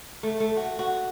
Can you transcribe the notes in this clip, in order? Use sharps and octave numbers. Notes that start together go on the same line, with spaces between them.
A3
A3
F#4
F#4